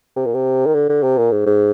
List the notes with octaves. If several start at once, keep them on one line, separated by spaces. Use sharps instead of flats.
C3
A#2
C3
D#3
D3
D3
C3
A#2
G#2
G#2